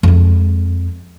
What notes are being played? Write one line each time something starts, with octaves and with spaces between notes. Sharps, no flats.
F2 G#3